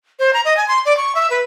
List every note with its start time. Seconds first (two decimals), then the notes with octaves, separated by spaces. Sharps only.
0.19 C5
0.33 A#5
0.45 D#5
0.57 G#5
0.68 C6
0.85 D5
0.97 C#6
1.15 E5
1.30 B4